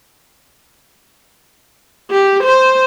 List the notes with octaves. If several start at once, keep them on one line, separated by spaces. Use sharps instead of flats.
G4
C5